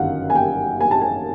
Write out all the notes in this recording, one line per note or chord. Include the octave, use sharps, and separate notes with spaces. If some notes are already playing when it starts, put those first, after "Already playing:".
Already playing: G1 F#2 D#3 F5 F#5
G#5
G5
G#5
A5
G#5